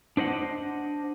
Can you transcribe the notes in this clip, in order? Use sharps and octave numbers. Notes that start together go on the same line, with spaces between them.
D4 C5 D#5 F#5